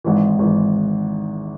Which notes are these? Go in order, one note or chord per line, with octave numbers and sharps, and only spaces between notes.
G#1 G#2 E3
G#1 G#2 E3